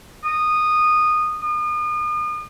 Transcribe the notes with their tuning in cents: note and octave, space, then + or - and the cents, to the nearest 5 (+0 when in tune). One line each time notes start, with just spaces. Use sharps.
D#6 -15
D#6 -40